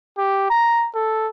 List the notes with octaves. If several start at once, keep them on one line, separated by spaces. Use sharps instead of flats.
G4
A#5
A4